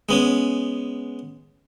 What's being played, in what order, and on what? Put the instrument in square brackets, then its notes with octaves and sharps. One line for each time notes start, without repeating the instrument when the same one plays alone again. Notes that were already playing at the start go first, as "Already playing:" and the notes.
[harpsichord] G#3 B3 C#4